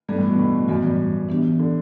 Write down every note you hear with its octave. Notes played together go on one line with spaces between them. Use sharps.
G2 E3 G3 B3 D4 A4
A2
B2
A2
F#2 A2 E3 B3 F#4
G2
E3 B3 D4 G4
D3